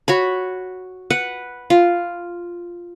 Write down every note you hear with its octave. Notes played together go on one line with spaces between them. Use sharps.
F#4 C#5 B5
B4 F#5
F4